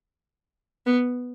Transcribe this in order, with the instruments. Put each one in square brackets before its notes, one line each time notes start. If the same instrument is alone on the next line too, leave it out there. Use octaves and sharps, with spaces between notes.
[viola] B3